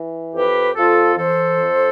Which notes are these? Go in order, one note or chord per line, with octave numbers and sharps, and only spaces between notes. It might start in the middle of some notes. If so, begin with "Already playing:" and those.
Already playing: E3
F2 G4 B4
F2 F4 A4
E3 A4 C5
F2